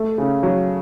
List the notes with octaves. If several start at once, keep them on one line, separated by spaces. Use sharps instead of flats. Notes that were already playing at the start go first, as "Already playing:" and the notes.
Already playing: A3
C#3
F#3